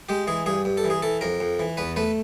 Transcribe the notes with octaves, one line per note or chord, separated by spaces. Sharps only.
G#3 G4
E3 G#4
G2 G#4
G2
A4
E3
G#4
E3 A4
F2 A#4
F2
E3
E2 B4
A3 B4